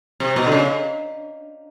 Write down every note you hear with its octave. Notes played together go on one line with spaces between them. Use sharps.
C3
B2
D3
C#3